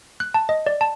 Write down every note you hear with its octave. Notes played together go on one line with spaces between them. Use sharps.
F#6
A5
D#5
D5
A5